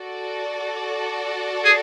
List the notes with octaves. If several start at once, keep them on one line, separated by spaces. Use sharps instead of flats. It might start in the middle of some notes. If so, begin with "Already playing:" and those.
Already playing: F#4 A4 D5
G#4